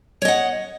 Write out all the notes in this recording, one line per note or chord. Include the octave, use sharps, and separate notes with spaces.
C#5 D#5 F#5